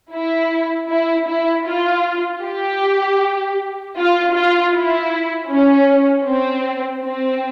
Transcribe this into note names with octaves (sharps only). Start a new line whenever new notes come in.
E4
E4
E4
F4
G4
F4
F4
E4
C#4
C4
C4